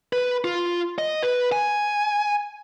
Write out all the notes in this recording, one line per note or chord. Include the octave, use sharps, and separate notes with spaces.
B4
F4
D#5
B4
G#5